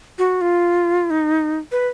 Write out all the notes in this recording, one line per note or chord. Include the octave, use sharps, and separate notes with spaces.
F#4
F4
D#4
B4